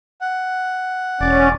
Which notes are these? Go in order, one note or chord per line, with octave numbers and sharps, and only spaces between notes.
F#5
E1 C#4 D5